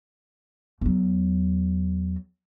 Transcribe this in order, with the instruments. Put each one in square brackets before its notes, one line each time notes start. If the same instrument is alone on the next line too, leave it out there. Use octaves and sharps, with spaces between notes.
[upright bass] E2 F#3